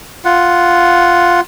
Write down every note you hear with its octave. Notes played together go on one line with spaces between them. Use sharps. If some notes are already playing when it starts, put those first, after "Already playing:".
F4 F#5